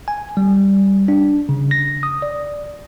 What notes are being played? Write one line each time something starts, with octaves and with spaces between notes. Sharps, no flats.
G#5
G3
D4
C#3
A#6
D#6
D5